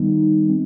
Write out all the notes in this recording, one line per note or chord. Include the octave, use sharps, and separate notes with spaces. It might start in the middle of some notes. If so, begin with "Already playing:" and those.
Already playing: D#3 G3 B3 D#4
G#3 C4